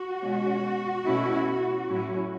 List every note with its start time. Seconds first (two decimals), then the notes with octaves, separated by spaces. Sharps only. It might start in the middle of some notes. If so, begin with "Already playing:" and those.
Already playing: F#4
0.21 B2 G#3 C#4
1.04 B2 A3 C#4 E4
1.87 A2 F#3 C#4 E4